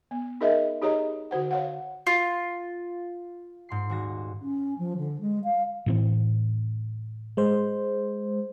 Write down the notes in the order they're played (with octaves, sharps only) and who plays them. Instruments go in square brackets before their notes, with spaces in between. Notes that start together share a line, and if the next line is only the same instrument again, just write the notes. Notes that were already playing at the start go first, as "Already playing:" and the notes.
[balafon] B3
D#4 G#4 A#4 D#5 E5
D#4 G4 G#4 C#5 D#5 A#5
D3 F#4 C5 F#5
C#5 F5 F#5
[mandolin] F4
[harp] G#2 C6 C7
D#1 F#4 A#6
[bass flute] C#4
F3
D3
G#3
F5
[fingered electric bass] A2 E3 C4
[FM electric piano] G#3 C5